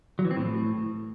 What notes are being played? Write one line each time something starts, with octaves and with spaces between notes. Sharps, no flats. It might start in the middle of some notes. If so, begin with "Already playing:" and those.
F#3
E3
C4
A2